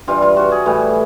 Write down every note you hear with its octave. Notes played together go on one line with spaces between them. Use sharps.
G2 E3 G3 F4
F4
F#4
G#4
A2 E3 G3